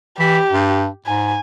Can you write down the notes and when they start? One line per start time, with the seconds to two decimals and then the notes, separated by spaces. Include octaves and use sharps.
0.19 E3 G4
0.52 G2
1.06 G#2 G#5